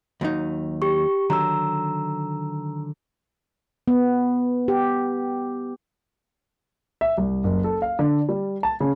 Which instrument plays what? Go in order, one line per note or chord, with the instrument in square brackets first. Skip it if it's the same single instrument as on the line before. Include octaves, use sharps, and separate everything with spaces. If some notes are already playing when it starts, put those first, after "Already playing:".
[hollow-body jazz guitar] D#2 F#3 D#4
[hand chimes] G4 C#6
[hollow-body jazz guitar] D3 D#3 F#3 [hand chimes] A#5 E6
[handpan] B3
G4
[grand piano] E5
C2
F#1
A4
F5
D3
G3
A5
C#3